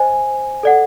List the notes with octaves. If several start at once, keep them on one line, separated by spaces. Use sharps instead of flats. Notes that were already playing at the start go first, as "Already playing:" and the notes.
Already playing: C5 D#5 G#5
A4 D5 F#5